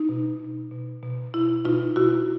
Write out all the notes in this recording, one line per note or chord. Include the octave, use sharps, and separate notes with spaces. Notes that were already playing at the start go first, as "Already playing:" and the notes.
Already playing: D#4
B2
B2
B2
B2
B2 E4
B2 D#4 F4
B2 E4 F#4